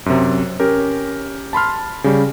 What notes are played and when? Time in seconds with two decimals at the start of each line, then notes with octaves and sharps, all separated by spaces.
0.06 F#2 C3
0.60 C#4 G4 A#4
1.53 A5 B5 C6 F6
2.04 C#3 G3